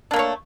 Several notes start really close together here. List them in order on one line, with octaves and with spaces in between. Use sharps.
D4 A#3 A3 C#5